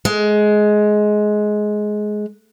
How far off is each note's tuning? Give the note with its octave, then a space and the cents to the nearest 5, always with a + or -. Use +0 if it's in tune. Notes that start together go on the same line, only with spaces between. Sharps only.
G#3 +15